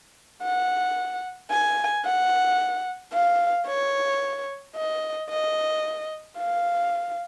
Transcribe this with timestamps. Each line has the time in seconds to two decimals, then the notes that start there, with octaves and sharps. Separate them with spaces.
0.43 F#5
1.51 G#5
2.05 F#5
3.13 F5
3.67 C#5
4.76 D#5
5.30 D#5
6.38 F5